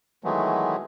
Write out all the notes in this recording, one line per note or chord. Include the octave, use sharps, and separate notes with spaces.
D#3 E3 F#3 G#3 A3 B3